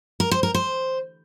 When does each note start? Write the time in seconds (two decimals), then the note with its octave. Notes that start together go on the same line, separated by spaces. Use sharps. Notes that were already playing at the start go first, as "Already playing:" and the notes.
0.20 A#4
0.31 C5
0.43 A#4
0.55 C5